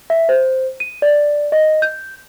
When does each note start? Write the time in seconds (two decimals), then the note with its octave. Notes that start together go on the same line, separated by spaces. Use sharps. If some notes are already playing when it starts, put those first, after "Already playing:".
0.10 E5
0.29 C5
0.80 D#7
1.02 D5
1.52 D#5
1.82 G6